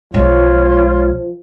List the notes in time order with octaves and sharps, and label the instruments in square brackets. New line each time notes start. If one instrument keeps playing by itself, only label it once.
[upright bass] B1 G#3 [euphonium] F3 [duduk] F4 [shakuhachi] C#5